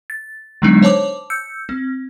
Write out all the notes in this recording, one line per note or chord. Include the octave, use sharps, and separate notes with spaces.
A6
D3 F#3 G#3 B3 D4 D#4
C5 C#5 A5 D6
E6 G6 C#7
C4